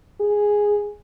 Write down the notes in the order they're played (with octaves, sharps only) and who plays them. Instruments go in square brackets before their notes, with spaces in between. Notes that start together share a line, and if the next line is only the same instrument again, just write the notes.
[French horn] G#4